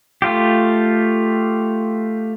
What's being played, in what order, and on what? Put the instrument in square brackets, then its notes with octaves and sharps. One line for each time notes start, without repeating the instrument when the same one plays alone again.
[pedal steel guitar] A3 F4 G4